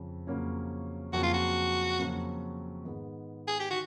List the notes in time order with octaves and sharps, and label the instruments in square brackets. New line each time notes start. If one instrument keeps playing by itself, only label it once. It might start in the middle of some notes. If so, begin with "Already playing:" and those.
Already playing: [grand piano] F2 C#3
F2 C#3 F#3 A#3 C#4
[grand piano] F2 C#3 F#3 A#3 C#4 [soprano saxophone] F#4
[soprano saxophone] F4
F#4
[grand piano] F2 C#3 F#3 A#3 C#4
G#2 D#3 G#3 B3
[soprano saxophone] G#4
G4
[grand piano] D#3 [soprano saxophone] F#4